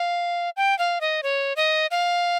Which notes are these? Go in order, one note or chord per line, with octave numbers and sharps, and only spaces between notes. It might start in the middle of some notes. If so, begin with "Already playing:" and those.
Already playing: F5
G5
F5
D#5
C#5
D#5
F5